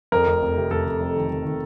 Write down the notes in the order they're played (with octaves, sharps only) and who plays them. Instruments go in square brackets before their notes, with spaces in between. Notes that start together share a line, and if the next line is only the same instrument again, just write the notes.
[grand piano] F2 A#4
F1
F1
C3
F1 A4
F1
F2
D#3
F2
D#3